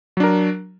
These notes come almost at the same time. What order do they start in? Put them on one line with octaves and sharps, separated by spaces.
F#3 D4 A#4